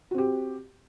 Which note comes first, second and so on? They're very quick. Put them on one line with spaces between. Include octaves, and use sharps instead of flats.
F#4 C4 G4